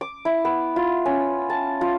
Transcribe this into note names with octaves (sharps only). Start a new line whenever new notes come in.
D6
E4
B3
F4
C#4
A5
F4